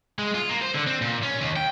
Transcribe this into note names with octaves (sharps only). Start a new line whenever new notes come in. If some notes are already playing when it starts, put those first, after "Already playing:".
G#3
F4
A#3
C5
D3
C4
A#2
C#4
D#2
G5